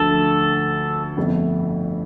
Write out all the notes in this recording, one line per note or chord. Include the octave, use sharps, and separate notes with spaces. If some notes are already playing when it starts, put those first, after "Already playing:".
Already playing: D2 D3 F3 A3 A4
G1 F2 F3 A3